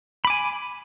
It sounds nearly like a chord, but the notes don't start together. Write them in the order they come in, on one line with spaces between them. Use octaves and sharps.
B5 D6 G#5